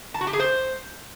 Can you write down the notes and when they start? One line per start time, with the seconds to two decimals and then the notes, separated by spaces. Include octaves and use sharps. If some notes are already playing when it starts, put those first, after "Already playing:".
0.14 A5
0.21 F#4
0.27 G4
0.33 G#4
0.40 C5